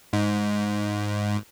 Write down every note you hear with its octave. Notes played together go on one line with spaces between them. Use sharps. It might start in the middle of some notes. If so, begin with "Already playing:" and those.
G#2